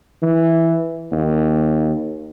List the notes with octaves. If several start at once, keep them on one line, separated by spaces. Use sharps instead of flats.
E3
D#2